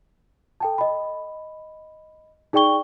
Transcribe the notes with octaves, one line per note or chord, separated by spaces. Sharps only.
A4 G5 A5
D#5 B5
D#4 G#4 D5 G5 C#6 G7